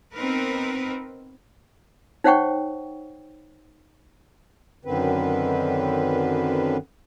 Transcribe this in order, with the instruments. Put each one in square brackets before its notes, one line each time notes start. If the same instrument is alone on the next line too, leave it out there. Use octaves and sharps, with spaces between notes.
[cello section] B3 C4 D#4 A#4 B4
[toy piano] D#4 C5 C#5 F#5 G5 C#6
[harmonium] F#2 D3 D#3 C4 B4